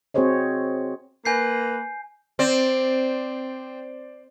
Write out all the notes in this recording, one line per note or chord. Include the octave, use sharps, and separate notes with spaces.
C4 F#4 G#4 C5 C#5 D#5
A#3 B4 G#5 G6 C7
C4 C5 D5